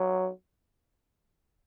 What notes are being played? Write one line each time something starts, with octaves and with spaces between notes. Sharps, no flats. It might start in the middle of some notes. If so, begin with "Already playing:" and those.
Already playing: F#3